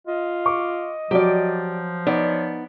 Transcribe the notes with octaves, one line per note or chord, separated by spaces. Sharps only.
F4 D#5
C#6 D6
F3 F#3 G4 D5
B3 D#4 C#5 D5